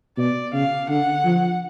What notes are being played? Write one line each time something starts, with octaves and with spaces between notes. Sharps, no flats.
B2 D5
C#3 F5
D3 F#5
F3